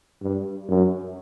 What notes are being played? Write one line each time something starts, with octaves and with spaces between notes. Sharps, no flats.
G2
F#2